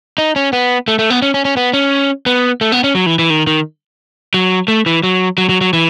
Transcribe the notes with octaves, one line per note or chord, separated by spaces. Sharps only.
D#4
C#4
B3
A3
A3
B3
C#4
C#4
C#4
B3
C#4
B3
A3
B3
C#4
F#3
E3
E3
D#3
D#3
F#3
A3
E3
F#3
F#3
F#3
F#3
E3